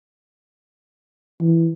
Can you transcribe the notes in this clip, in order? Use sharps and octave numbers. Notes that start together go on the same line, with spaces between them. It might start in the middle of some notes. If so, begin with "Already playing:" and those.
E3